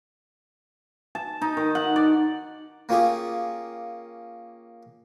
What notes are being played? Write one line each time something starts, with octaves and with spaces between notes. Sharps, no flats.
A5
D#4
D#3
F#5
D5
A#3 C#4 F4 G4 G#4